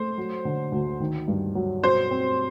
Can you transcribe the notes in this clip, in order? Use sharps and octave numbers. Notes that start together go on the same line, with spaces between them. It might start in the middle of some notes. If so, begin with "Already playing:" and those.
Already playing: A3 C5
F#3
D3
D2
D#3
G2
F#3
B2 C5
C4